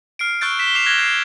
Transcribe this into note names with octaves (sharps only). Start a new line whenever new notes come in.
F6 C7 D7
C#6 E6 F#6 G6 A6 D7
B6 E7 G7
D6 C7 E7 F7 G7
F#6 G#6 A#6
G6 C7